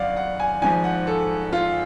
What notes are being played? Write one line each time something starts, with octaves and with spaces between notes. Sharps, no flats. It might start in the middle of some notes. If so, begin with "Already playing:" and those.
Already playing: G#1 F#2 D5 F5 F#5
F#5
G#5
G#1 G#2 F3 G#5
F#5
A4
F4